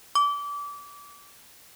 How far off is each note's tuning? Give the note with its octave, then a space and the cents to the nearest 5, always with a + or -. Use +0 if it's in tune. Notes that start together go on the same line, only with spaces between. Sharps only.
D6 -30